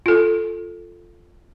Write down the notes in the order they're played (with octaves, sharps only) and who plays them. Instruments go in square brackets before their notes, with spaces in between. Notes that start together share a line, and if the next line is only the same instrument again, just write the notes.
[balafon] F4 A4